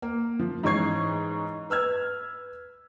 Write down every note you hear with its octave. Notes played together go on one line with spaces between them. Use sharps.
A#3
F3
G#2 E3 C#4 C#6 G#6 C7
B4 E6 F6 G#6